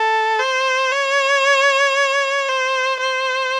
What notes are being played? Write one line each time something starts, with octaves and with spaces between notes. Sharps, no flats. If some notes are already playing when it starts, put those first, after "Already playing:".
Already playing: A4
C5
C#5
C5
C5